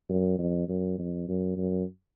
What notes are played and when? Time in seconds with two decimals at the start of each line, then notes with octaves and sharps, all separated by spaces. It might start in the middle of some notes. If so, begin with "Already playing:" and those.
0.10 F#2
0.39 F2
0.69 F#2
0.99 F2
1.28 F#2
1.57 F#2